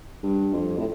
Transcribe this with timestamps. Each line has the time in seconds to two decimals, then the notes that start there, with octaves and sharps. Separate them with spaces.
0.23 G2
0.53 F2
0.78 A2